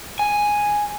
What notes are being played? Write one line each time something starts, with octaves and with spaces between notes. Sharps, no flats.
G#5